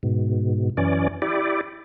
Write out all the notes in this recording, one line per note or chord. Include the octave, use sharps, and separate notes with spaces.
G#2 B2
F#2 E3 C#4 D5
E4 G4 D5